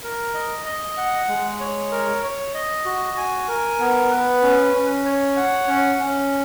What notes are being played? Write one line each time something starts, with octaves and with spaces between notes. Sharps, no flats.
A#4
D#5
D#5
F#5
G#3
C#5
A#4
C#5
D#5
F#4
G#5
A#4
B3
B4
C#4
C#4
C#5
F#5
C#4
C#4